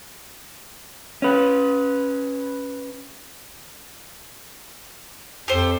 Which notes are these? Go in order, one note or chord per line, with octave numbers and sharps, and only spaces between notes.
C#4 B4
F2 G4 A4 C5